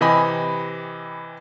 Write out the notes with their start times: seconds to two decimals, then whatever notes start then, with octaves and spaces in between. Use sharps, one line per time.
0.01 C3 E3 G4 D#5 G#5 B5